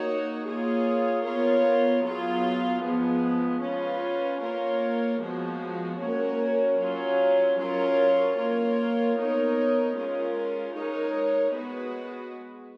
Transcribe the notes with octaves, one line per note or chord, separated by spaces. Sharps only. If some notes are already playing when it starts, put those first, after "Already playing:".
Already playing: A#3 D#4 F#4 C#5
A#3 F4 G#4 C#5
B3 F4 A#4 C#5
F#3 B3 F4 G#4
F3 G#3 B3
C#4 F4 B4
A#3 F4 A#4 C#5
F3 G#3 B3 F#4
A#3 C#4 F#4 A#4 C#5
F#3 C#4 F4
F#3 C#4 F4 A#4 C#5
A#3 F4 A#4 C#5
B3 D#4 A#4 C#5
G#3 C#4 F4 A#4
G#3 D#4 A#4 C#5
G#3 B3 F#4 B4